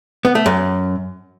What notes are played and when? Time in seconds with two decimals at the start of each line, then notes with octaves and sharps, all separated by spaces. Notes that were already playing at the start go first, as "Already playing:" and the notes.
0.25 B3
0.35 A3
0.46 F#2